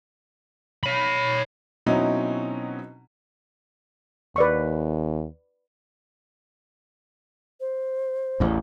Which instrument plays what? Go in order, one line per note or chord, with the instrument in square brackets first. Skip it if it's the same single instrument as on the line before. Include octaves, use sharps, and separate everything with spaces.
[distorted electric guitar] C#5 B5
[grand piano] B2 F#3 C4 C#4 D#4 E4
[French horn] D#2 [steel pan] B4 D5 C#6
[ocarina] C5
[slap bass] A1 E2